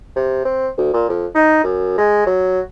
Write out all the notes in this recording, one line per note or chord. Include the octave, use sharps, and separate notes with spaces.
C3
C4
D2
A#2
F2
D#4
F#2
G#3
F#3